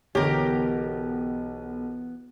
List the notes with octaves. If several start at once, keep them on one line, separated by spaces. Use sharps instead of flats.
B1 D3 E3 B3 G4 A#4 C#5